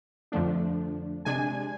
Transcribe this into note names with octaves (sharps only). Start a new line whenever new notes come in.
F2 D3 F3 A3 D4
C3 G#3 D4 G#5